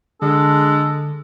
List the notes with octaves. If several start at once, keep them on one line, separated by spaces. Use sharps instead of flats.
D3 G#3 D4 A4